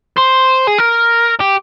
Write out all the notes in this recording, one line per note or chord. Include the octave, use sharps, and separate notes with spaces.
C5
G#4
A#4
G4